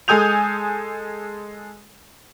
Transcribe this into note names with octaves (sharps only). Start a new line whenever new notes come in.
G#3 A4 G#5 D#6 G6 F7